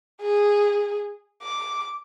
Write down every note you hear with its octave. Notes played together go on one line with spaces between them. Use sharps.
G#4
D6